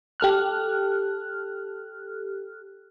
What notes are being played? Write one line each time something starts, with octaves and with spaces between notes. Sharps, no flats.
G4 A4 F6 F#6